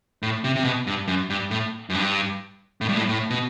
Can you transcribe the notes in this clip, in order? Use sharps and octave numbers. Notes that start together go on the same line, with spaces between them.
A2
C3
C3
B2
G2
F#2
G2
A2
F#2
G2
A2
G2
A2
A2
B2